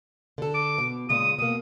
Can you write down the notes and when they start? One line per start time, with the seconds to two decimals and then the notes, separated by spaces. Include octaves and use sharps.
0.38 D3 A4
0.54 D6
0.78 B2
1.09 A#2 C#3 G#3 D#6
1.38 B2 A#3 D#6